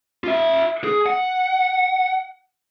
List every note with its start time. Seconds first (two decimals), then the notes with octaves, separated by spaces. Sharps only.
0.24 F4 E5
0.84 G#4
1.06 F#5